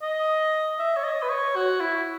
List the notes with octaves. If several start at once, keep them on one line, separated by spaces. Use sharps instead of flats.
D#5
E5
C#5
D#5
B4
C#5
F#4
E4